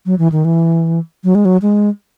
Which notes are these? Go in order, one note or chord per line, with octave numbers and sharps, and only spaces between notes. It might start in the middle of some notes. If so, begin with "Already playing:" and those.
F#3
E3
D#3
E3
F#3
G#3
F#3
G#3